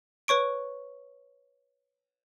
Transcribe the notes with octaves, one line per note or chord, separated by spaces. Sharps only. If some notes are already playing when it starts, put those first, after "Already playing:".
B4 C#5 C#6 D7